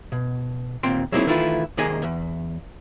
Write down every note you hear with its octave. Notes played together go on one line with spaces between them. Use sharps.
B2
D#2 A#2 C4 G5 C6
F#3 G#3 A#3 C4 D#4 E4
D#3 E3 A3 C#4 E4 F4
C2 D#3 A#3 G#4 D#5 G#5
E2